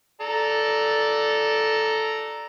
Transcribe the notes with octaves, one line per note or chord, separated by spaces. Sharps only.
A4 D5 A#5